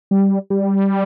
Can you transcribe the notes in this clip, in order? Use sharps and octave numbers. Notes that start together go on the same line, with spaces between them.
G3
G3